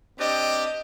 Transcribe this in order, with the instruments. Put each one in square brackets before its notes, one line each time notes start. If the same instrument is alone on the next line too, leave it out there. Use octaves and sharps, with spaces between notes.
[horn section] C4 D4 G4 [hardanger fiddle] D#5